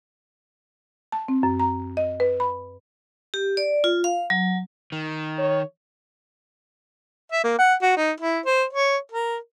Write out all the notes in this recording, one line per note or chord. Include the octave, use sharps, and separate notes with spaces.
A5
C4
F#2
A#5
D#5
B4
B5
G4
D5
F4
F5
F#3
D#3
C#5
E5
A#3
F#5
F#4
D#4
E4
C5
C#5
A#4